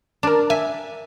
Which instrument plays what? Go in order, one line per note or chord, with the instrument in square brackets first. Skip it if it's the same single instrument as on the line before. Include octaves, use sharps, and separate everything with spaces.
[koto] D4 [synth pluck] A#4 A5
[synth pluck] E5 [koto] G#5